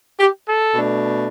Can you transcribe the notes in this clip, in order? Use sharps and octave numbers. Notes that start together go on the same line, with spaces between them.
G4
A4
B2 A3 D4